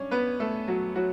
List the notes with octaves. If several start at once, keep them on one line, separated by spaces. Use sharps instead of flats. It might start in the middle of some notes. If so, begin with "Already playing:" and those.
Already playing: G2 F#3 C#4 D4 C#5
B3 B4
A3 A4
F#3 F#4
F#3 F#4